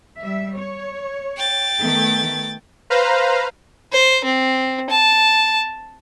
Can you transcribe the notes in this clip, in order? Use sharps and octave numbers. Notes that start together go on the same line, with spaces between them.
G3 E5
C#5
G5 A6
D#3 A3 B3
B4 C5 F5 A#5
C5
C4
A5